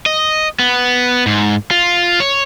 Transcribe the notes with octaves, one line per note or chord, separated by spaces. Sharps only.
D#5
B3
G#2
F4
C#5